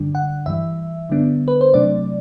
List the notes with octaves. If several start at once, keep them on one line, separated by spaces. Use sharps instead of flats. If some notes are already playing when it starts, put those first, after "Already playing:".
Already playing: G2 D3 G3 D4
F#5
G2 E3 G3 E5
D3 G3 B3 D4
B4
C5
C3 F#3 A3 D4 D5